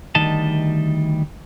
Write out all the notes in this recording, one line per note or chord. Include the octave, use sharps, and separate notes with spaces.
D2 D#3 G3 D#5 A5